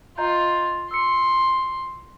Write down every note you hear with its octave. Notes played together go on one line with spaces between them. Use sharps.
F4 D#5 A#5 G6
C6 E6 C#7